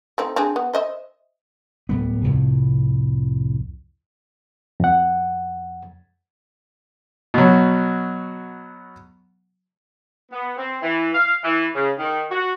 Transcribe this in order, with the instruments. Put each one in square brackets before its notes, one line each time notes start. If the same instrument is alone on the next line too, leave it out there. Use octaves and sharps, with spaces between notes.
[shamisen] A3 C4 D#4
C4 D4 G#4
B3
C5 D#5 E5
[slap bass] D1 G3 B3
C2 F2 A2
[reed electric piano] F2 F#5
[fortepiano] B2 F#3
[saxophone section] B3
C4
E3
F5
E3
C#3
D#3
F#4